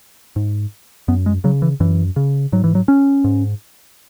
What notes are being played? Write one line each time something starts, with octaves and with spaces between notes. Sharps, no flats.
G#2
F#2 B3
G#3
C#3 F#3
E3
F#2 E3
C#3
G#2 F#3
E3
F#3
C#4
G#2